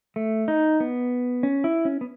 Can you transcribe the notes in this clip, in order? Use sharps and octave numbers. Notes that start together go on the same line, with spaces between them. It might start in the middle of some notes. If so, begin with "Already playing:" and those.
A3
D#4
B3
C#4
E4
C#4
B3